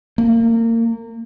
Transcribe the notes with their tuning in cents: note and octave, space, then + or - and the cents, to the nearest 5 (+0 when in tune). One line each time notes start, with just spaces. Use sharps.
A#3 -30